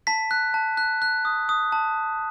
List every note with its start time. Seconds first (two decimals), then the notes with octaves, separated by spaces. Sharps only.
0.07 A5 B6
0.31 F#6
0.54 A5
0.77 F#6
1.02 F#6
1.25 D#6
1.49 D#6
1.72 A5